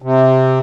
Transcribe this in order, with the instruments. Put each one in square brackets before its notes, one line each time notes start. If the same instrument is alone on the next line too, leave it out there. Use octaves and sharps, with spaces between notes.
[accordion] C3